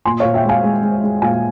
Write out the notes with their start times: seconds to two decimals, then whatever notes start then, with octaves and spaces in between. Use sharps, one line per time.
0.05 A#2 G#5 C6
0.20 C#5 F5
0.25 A#2
0.34 E5 G5
0.44 G#3 F5 G#5
0.63 G#3
0.83 G#3
1.03 G#3
1.22 A#2 F5 G#5